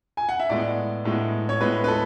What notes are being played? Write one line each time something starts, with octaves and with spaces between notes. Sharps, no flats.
G#5
F#5
E5
A2 G#3 B3 D5
A2 G#3 B3
C#5
A2 G#3 B3 B4
B4
A4